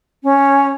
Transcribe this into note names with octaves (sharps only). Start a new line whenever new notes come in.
C#4